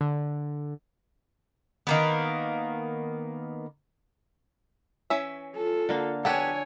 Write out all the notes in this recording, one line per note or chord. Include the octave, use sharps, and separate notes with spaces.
D3
D#3 A#3 B3
E3 C#4 E5
F4 A4
D3 A#3 F5
B3 D4 G4 A4 C#5 F#5 G#5